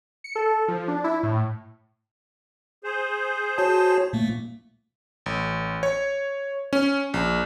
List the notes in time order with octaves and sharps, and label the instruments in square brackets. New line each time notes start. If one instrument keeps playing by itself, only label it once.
[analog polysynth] C#7
A4
F3
D4
E4
A2
[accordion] G#4 C5
[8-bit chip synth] F#4 C#5 A5
A#2 A3 A#3
[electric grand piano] A1
C#5
C#4
A#1